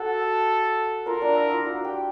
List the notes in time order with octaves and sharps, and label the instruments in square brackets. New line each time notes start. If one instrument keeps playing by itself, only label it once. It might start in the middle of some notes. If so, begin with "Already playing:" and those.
Already playing: [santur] F#4 F#5 [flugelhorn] A4
[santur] F4 F5 [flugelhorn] A#4
[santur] D4 D5
E4 E5
F4 F5
F#4 F#5
G4 G5